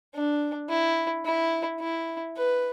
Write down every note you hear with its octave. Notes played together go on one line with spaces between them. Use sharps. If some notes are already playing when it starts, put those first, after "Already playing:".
D4
E4
E4
E4
B4